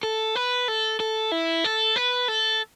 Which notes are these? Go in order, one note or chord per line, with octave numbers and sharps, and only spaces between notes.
A4
B4
A4
A4
E4
A4
B4
A4